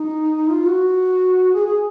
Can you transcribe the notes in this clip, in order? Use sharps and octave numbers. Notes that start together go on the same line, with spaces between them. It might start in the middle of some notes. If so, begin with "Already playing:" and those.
Already playing: D#4
F4
F#4
G#4
G#4